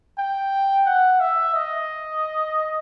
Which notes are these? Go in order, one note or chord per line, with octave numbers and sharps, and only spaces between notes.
G5
F#5
E5
D#5